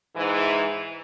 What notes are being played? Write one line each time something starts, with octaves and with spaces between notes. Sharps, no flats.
G#2 E3